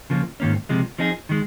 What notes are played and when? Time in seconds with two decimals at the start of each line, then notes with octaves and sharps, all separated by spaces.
0.10 C#3 F3 A#3
0.40 G#2 D#3 A#3 C#4
0.69 C#2 C3 F3 G#3
0.98 F3 C4 D#4 G#4
1.29 D#3 G#3